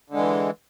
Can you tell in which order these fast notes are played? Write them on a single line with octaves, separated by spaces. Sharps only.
D3 G#3 E3